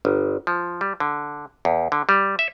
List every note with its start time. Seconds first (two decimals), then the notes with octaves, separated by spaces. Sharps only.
0.05 G1
0.47 F3
0.81 G3
1.00 D3
1.65 E2
1.92 D3
2.09 G3
2.39 E5